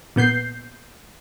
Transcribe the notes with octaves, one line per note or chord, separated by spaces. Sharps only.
A#2 B3 G6 C7